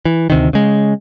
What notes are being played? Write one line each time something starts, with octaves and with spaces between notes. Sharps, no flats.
E3
D2 C3 D#3
C#3 G#3